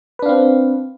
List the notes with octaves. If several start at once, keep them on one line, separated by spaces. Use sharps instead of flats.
C4 D4 B4 F5